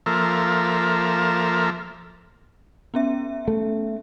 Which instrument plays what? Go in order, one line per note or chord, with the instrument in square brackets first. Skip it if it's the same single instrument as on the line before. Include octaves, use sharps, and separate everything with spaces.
[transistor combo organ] F3 A#3 A4 A#4 E5
[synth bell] B3 C#4 E5
[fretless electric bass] A3